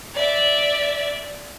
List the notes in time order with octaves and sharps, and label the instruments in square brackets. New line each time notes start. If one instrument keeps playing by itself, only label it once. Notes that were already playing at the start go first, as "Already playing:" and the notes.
[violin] D5 E5